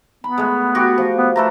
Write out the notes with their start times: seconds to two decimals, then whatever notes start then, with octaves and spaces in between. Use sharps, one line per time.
0.24 B3 B5
0.38 G#3 A3
0.75 F#4 G4
0.98 F3
1.17 B3
1.36 A3 A4 B4 A#5